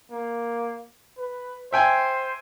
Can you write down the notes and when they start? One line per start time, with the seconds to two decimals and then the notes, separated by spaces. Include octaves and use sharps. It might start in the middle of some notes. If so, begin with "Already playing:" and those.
0.12 A#3
1.18 B4
1.73 C5 E5 G5 G#5